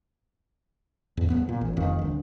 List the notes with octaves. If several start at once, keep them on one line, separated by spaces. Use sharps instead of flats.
E2 A2
D1 B3
A#2
A1
F1 F2 D#3
D#1 D2